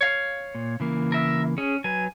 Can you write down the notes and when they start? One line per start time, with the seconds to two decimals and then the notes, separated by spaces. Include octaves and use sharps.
0.01 C#5 F5
0.55 A#2
0.80 C#3 E3 A#3
1.12 A#4 E5
1.58 C#4 G#4
1.84 F#3 B4 G#5